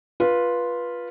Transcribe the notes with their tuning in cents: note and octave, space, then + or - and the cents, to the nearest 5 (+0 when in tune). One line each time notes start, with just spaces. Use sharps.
F4 +0 B4 -15